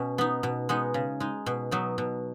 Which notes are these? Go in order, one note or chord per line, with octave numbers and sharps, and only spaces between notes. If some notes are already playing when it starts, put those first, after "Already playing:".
Already playing: B2 C#4
B3 D#4
B2
G#3 B3 D#4
C#3
G#3 D#4
B2
F#3 B3 D#4
B2